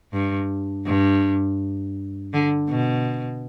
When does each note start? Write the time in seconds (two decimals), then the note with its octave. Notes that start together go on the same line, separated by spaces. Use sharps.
0.13 G2
0.86 G2
2.33 D3
2.69 B2